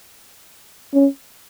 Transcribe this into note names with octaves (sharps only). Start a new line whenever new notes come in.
C#4